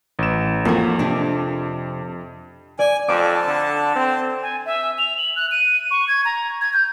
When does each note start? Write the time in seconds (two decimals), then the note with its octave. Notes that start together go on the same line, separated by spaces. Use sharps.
0.19 A1 E7
0.65 F2 A#3 F#4
0.99 C3 D4
2.79 D5 G#5
3.08 F2 A4 A5 D6
3.47 D3
3.95 C4
4.42 G#5
4.66 E5
4.98 F7
5.18 F#7
5.36 F#6
5.51 D#7
5.91 C#6
6.08 G#6
6.25 A#5
6.61 G#6
6.73 G6